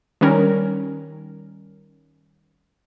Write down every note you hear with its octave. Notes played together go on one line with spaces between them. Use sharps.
D#3 G3 C#4 A#4